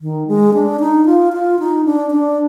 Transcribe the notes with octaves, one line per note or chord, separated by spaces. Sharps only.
D#3
G#3
D4
D#4
F4
F4
D#4
D4
D4